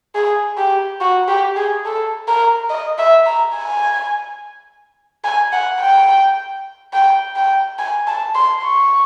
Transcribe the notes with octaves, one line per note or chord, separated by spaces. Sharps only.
G#4
G4
F#4
G4
G#4
A4
A#4
D#5
E5
A#5
G#5
G#5
F#5
G5
G5
G5
G#5
A5
C6
C#6